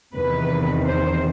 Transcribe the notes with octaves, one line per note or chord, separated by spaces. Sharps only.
E2 C3 D#3 B4
C5